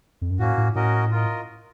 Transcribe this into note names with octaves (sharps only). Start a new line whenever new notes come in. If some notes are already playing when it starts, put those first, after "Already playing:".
F2
F#2
A2 A#3 C#4 F#4
A2
A2 C#4 F#4 A#4 D#5
F4 A#4 D#5